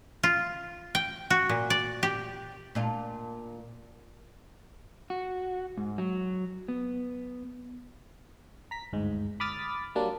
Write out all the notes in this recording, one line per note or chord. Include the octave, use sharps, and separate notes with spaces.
F4
G5
F#4
A#2
D5
G4
A#2 D4 F4
F#4
G#2
F#3
B3
A#5 B6
G1 D2 G#2 G#3
B5 D6 D#6 F6 A6 B6
F#3 G3 A#3 D4 D5